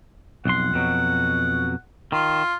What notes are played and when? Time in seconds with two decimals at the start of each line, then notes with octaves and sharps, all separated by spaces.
0.45 B1 F2 F#5 C6
0.74 F2 B2 F#3
2.12 D#3 F4